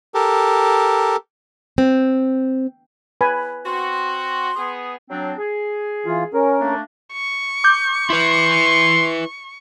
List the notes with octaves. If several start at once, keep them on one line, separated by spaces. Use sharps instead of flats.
G4 A4 A#4
C4
B4 G#5 B5
C4 F#4 C6
B3 G#4
F#3 C4 D4
G#4
E3 F4
C#4 A#4
A3 A#3 D4
C#6
D6 G6
E4 B4 C6